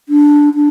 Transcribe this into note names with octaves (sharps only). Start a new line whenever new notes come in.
D4
D4